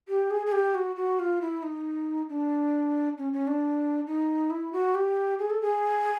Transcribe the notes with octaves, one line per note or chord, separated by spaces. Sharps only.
G4
G#4
G#4
G4
F#4
F#4
F4
E4
D#4
D4
C#4
C#4
D4
D#4
E4
F#4
G4
G#4
A4
G#4